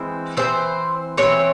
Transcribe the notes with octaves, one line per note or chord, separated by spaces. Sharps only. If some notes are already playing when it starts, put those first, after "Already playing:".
Already playing: E3 G#3 C4
E3 G#3 C4 C5
E3 G#3 C4 C#5